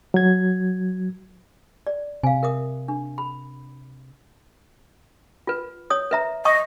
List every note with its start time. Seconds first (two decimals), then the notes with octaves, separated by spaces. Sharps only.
0.14 F#3 G#6
1.87 D5
2.23 C3 F5 G#5
2.43 A#4 E5 D#6
2.88 D4
3.18 B5
5.47 F4 B4
5.90 C#5 D#6
6.11 B4 E5 A#5
6.45 D#5 A5 C#6 D#6